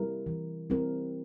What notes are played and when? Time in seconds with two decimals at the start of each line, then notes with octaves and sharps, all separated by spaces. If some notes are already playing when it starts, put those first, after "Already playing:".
Already playing: G3 C4 E4 A#4
0.26 E3
0.70 G3 C4 E4 A#4